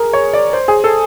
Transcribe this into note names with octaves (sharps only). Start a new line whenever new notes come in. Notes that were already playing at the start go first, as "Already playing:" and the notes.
Already playing: G#4 A#4
C#5
D5
C5
G#4
A4